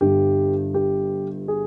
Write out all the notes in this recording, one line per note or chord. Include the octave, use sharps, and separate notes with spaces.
G1 G2 G3 G4
G4
G#4